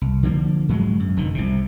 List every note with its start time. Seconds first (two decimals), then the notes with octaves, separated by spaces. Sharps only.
0.01 C2
0.23 D3 F3 A#3
0.69 G#2 F#3 G#3
1.00 F#2
1.17 F1 D3 D#3
1.35 C2 C3